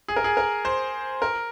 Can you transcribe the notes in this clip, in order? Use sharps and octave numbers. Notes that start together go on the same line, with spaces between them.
G#4
A#4
G#4
A#4
C5
A#4